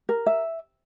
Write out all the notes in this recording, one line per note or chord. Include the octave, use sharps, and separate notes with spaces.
A#4
E5